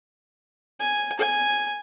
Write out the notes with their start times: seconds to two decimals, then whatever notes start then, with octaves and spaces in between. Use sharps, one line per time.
0.80 G#5
1.19 G#5